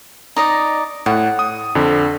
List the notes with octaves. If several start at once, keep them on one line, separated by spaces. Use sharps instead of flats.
D#4 D5 D#5
A2 F#5
D#6
F2 D3